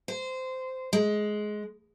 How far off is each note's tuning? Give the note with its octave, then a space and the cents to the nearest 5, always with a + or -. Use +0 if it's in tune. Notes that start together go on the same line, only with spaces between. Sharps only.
C5 -15
G#3 +15